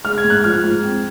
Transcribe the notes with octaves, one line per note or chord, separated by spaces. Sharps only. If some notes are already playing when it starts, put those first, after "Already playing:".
G#3 F6
G#6
G#2
F#6
F3 F6
G#2
C4